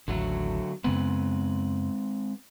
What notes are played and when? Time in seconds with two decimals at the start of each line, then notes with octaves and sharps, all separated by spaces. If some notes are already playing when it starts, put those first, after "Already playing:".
0.08 A1 D#2 D3 F#3 A3
0.84 F#2 C#3 G#3 B3 C4 B4